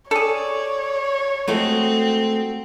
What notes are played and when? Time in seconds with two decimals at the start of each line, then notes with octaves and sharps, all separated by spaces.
0.11 G#4 A4 C#5 D5
1.48 G#3 A3 C4 F#4